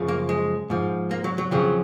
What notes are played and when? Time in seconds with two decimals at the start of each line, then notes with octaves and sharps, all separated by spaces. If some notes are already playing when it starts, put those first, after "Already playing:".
Already playing: F#2 C#3 F3
0.08 A#3
0.29 G#3
0.70 G#2 F3
1.11 A#3
1.24 F#3
1.38 F#3
1.51 F2 C#3 F3 F#3